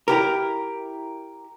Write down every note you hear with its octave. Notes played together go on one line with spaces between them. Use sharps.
E4 G4 A#4